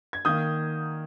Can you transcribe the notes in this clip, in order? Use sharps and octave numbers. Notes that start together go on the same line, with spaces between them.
G#6
D#3 A#3 D#6 G6